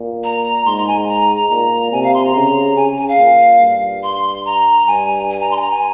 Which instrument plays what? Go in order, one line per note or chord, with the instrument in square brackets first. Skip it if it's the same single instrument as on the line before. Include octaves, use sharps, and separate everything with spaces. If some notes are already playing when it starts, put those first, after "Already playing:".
Already playing: [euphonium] A#2
[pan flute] A#5
[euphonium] G#2 [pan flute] C6
[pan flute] A#5
G#5
A#5
[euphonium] A#2 [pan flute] A#5
[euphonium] C3 [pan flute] G#5
[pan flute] F5
C6
A#5
[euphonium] C#3
[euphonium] C#3 [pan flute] G#5
[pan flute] G#5
F5
[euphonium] A#2
G2
[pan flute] C6
A#5
[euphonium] G2 [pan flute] G#5
[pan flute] G#5
A#5
C6
G#5
A#5
G#5